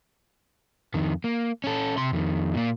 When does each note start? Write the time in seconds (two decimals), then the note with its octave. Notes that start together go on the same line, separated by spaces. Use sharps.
0.94 F2 D#3
1.24 A#3
1.64 C#4 A4
1.97 C3 C6
2.13 F2 D#3
2.55 A#2 A#3